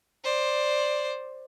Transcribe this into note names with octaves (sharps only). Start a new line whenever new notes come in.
C5 D5